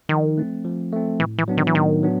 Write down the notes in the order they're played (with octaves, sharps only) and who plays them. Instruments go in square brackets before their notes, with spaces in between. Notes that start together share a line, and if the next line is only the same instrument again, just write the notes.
[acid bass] D#3 [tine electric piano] F3
[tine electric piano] A3 C4
F3
A3 C4
[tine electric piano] A2 [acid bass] E3
[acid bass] E3
[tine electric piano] F#3 B3 D4
[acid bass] D#3
E3
[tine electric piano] A2 [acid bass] D#3
[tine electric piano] F#3 B3 D4